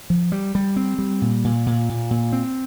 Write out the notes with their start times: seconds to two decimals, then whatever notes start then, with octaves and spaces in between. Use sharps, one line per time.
0.10 F3
0.32 G3
0.55 G3
0.76 C4
0.98 G3
1.22 A#2
1.44 A#2
1.66 A#2
1.89 A#2
2.11 A#2
2.32 C4